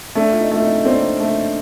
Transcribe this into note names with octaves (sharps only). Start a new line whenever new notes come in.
A3 A#3 D4
F4
C4 D#4
A3 F4
C4 D#4
A#3 C4 D4
A3